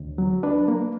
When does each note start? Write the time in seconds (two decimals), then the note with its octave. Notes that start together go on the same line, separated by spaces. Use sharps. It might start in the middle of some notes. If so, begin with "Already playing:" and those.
Already playing: D2
0.18 F#3
0.43 D4 B4
0.68 A#3